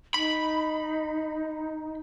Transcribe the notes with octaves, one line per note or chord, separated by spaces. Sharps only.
D#4 B5